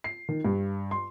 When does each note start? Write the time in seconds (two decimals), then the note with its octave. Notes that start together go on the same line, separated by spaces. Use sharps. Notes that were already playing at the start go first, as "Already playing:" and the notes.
0.04 C7
0.29 D#3
0.45 G2
0.91 C6